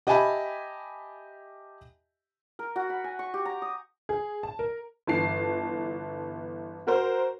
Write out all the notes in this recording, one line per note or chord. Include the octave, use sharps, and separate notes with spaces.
G4 D#5 E5 G#5 A5 B5
A#4
F#4
B5
G#5
C#6
G4
A#5
D#6
G#4
A5
A#4
G1 E3 A5 C7
F#4 A#4 C5